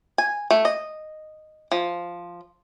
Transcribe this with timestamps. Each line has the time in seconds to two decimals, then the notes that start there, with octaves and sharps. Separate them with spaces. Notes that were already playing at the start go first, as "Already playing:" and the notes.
0.18 G#5
0.51 A3
0.65 D#5
1.72 F3